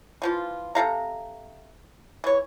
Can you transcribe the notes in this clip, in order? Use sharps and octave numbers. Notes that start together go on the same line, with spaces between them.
E3 F3 F4
C3 A4 F5 A#5
E3 C#5